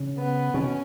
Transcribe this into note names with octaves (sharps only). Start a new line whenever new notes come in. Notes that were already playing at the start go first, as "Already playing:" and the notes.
Already playing: C#3
B3
B2 C#4